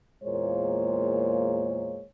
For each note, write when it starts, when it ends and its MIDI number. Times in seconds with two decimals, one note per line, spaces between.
0.24 2.04 40
0.24 2.04 46
0.24 2.04 56
0.24 2.04 58
0.24 2.04 72
0.24 2.04 73